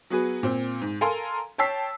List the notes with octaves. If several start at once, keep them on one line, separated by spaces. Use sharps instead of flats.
F#3 B3 F#4 G#4 B4
A#2 C4
G#2
A4 A#4 F5 G#5 A#5 C6
C#5 G5 A5 E6 B6 C7